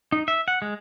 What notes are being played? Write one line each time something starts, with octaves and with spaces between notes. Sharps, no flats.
D#4
E5
F#5
G#3